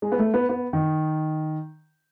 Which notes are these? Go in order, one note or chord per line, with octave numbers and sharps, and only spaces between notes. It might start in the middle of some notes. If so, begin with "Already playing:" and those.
G#3
B3
A3
B3
B3
D#3